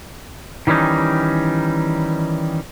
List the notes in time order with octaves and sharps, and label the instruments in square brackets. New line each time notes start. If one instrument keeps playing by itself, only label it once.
[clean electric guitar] D#3 E3 G3 C#4 D#4